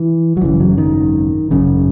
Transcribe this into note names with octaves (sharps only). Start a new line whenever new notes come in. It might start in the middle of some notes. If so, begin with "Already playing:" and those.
Already playing: E3
F#3
G#1 F#2 C#3 E3
F#3
D#3
G#1 F#2 C#3